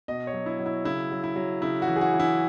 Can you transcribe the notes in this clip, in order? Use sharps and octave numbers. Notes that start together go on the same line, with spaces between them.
B2 D#5
C#5
F#3
E4
F#3
E4
C#3 E4
F#3
E4
F#3
C#3 E4
F#4
E3
G#4
F#4
E3
E4